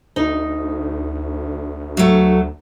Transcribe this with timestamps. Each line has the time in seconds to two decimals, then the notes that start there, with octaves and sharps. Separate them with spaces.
0.16 D2 D#4
1.97 F#3 A3